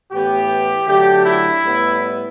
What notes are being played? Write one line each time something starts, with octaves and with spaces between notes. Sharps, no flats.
A2 E3 B3 G4
D3 F#3 A3 G4
E4
A2 G3 B3